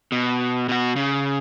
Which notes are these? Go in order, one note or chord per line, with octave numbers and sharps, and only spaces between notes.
B2
B2 F#4
C#3